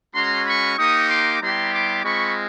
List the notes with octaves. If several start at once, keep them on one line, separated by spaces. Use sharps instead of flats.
G#3 C#4 F#4 A#5 C6
B5 C#6
A#3 D#4 G4 C#6 D#6
C6 D6
G3 B3 E4 G4 A#5 C6
C6 D6
G#3 C4 F4 B5 C#6